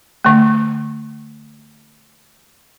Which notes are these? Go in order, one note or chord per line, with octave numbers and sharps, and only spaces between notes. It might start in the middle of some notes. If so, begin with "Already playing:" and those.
D3 A3